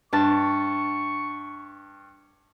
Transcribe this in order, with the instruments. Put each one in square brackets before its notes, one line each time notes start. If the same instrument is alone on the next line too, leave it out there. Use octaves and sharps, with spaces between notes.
[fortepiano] G2 [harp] A5 [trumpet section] C#6